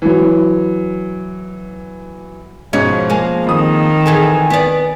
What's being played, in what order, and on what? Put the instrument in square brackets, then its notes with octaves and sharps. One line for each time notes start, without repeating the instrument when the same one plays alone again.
[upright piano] E3 F#3
[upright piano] G#2 B2 C#4 [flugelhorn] F3 [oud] C#5
[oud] G#3 A#3 [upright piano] G#5
[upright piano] F2 D#6 [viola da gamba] D#3
[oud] E3 G#4 A4 [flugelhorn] G#5
[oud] B3 D5